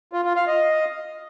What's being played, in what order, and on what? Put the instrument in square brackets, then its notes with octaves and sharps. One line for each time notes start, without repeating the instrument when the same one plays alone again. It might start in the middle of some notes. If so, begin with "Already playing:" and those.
[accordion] F4
F4
F5
D#5